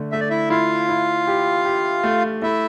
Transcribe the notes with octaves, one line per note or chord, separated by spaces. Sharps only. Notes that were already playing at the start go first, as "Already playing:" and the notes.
Already playing: D3 A3
A3 E5
D5
E4 E5
E4 F4 F5
E4
G4
G4
A3
A3 E4 E5